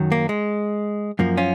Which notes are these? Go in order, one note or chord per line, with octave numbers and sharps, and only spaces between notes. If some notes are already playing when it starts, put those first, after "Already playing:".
Already playing: F#2 D#3 F#3
A#3
G#3
F#2 F3 A#3
C#4 F4